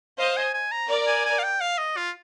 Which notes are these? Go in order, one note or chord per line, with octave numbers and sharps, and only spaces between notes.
C5 D#5 F5
G#5
G#5
A#5
A#4 D5
G#5
G#5
F5
G5
F5
D#5
F4